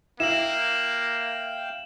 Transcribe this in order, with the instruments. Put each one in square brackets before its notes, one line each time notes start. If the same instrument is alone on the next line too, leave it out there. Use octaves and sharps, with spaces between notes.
[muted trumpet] A#3 [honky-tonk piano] E4 [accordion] F5 G5 [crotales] E7 F#7